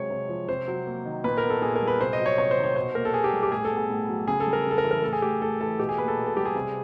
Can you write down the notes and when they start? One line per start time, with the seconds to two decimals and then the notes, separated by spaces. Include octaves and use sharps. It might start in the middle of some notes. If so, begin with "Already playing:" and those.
Already playing: C3 F#3 G#3 C#5
0.11 C3
0.29 F3
0.48 C3 C5
0.68 F#3
0.87 A#3
1.05 D#3
1.24 A#2 B4
1.38 A#4
1.43 B3
1.50 A4
1.62 A#2 G#4
1.76 A#4
1.82 G3
1.88 B4
2.00 C3 C5
2.13 D#5
2.20 F#3
2.26 C#5
2.38 C3 C#5
2.51 C5
2.57 D#3
2.64 C#5
2.76 B2 C5
2.95 A#3 A#4
3.05 A4
3.14 B2 G#4
3.24 G4
3.33 G3
3.43 G4
3.52 A2 G#4
3.65 A4
3.71 B3
3.77 G#4
3.90 A2
4.09 F#3
4.27 C#3 G#4
4.40 A4
4.47 G3
4.53 A#4
4.66 C#3 A4
4.78 A#4
4.84 E3
4.91 A#4
5.04 A2 A4
5.13 G#4
5.22 A3 G4
5.42 A2 A4
5.61 E3 A4
5.79 B2 G4
5.89 G#4
5.98 A#3 B4
6.08 A4
6.17 B2
6.26 A4
6.36 G3 G4
6.45 G#4
6.55 C3